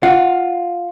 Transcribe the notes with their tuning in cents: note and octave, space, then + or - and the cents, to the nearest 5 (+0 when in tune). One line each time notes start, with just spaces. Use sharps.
F4 +5 F#5 +0